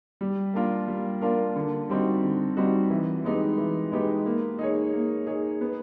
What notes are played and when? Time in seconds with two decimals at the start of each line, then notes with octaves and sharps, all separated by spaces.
0.21 G3
0.54 A#3 D4 F4 A#4
0.88 G3
1.21 A#3 D4 F4 A#4
1.56 D3
1.90 G3 C4 D#4 F#4
2.23 D3
2.57 G3 C4 D#4 F#4
2.90 E3
3.24 G#3 B3 D#4 G4
3.58 E3
3.92 G#3 B3 D#4 G4
4.26 A#3
4.59 D#4 G#4 C#5
4.93 A#3
5.27 D#4 G#4 C#5
5.61 B3